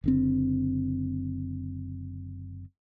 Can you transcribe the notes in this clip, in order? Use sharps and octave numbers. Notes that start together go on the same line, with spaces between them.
F#1 D3 C4